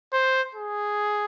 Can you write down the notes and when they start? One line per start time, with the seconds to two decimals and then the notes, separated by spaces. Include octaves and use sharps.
0.13 C5
0.55 G#4